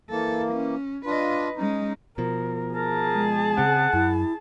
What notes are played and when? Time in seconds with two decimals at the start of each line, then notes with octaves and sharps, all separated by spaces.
0.11 E3 A#3 A4
0.52 C#4
1.06 D4 F4 B4 D#5
1.56 G#3 C#4 D#4
2.18 B2 F3 A#4
2.74 G#4 A#4 A5
3.14 G#3
3.57 C#3 C4 F#5
3.93 F#2 E4